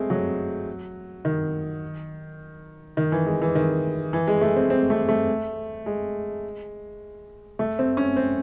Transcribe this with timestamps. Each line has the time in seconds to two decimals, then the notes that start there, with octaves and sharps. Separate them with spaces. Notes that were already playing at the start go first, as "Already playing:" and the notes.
Already playing: G#3 A3 C4
0.10 F#3
1.25 D#3
2.97 D#3
3.12 E3
3.26 G#3
3.42 E3
3.55 D#3
4.13 E3
4.27 G#3
4.41 A3
4.56 C4
4.70 C4
4.90 A3
5.09 A3
5.86 G#3
7.59 A3
7.79 C4
7.97 C#4
8.17 C4